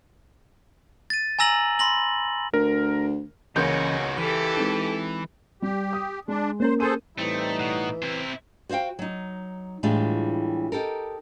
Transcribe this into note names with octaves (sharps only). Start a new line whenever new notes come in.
A6 D#7
G#5 A#5 E6 A#6 F#7
B5 C6 A#6 F#7
D2 A#4
C#2 C#3 E3 A#3 C#4 D#4 F#4 G6
E3 G4 A4 F6
G#3 C4 D#4
G3 G4
D#6
G#3 D4
A#3 C#4 A#4 C5
G#4 A4 C5 D#7
A2 E3 G3 A3 C4 D#4
B2 F#5
C3 C4 E4 C5
F#4 C5 C#5 F5 G5
F#3 D#4
A2 E3 G3 G#3 D4 F4
D#4 G4 A4 A#4